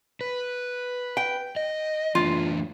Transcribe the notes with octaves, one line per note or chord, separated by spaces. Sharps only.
B4
G5
D#5
E3 A3 D4 F4